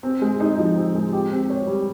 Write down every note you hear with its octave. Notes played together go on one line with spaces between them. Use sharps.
C4
G#3
D#4
F3
C4
G#3
G4
C4
C#5
G3